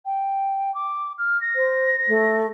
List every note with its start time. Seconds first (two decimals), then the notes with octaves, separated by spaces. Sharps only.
0.05 G5
0.74 D6
1.18 F6
1.41 A#6
1.55 C5
2.07 A3